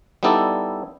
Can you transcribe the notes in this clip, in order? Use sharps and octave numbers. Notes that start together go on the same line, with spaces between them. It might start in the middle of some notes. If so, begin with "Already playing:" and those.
G3 B3 D#4 E4 A4 D5